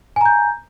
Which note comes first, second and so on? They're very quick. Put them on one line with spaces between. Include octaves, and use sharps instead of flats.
G#5 A#5 G6